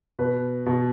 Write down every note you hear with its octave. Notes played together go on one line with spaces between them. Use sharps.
B2 B4
B2